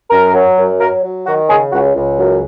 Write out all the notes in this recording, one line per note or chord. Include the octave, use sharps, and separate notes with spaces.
F#2 A#4
F#3
F#2
F#3 A#4
F#3
D#3 F#4
C#3 G#4
C#2 F#4
C#2
F#2